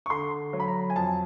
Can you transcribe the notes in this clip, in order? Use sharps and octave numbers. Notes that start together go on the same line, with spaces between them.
C#6
D3 C6
F#3
B5
A#5
G#5
F2 A5